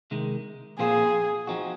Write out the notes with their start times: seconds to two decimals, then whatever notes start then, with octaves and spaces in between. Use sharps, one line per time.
0.11 C3 D#3 G#3
0.79 A#2 F3 C4 F4 G#4 C5
1.47 F3 C4 D#4 F#4